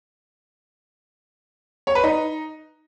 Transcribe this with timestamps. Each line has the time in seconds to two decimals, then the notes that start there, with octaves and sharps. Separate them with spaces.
1.87 C#5
1.95 B4
2.03 D#4